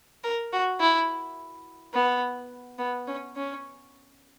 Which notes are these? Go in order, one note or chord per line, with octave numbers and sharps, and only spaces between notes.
A#4
F#4
E4
B3
B3
C#4
C#4